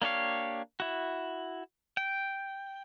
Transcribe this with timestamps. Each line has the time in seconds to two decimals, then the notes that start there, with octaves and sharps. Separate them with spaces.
0.02 A#3 D4 G4 C#5 F5
0.80 E4 F#4
1.97 G5